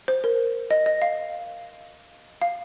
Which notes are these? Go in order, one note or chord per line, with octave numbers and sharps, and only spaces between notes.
C5
A#4
D#5
D#5
F5
F5